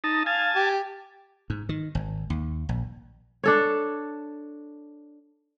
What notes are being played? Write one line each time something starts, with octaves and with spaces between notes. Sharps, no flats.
D#4 A5
F5 G#5 A5
G4
G#2
D#3
G#1
D#2
A#1
D4 A4 C#5